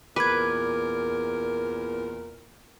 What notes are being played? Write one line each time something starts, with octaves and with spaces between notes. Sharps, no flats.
E2 A#2 A#4 B4 D6 G#6